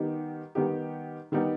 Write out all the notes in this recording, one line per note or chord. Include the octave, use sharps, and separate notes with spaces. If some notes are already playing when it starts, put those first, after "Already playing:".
Already playing: D#3 G3 B3 D#4 G4
D#3 G3 B3 D#4 G4
D#3 G3 B3 D#4 G4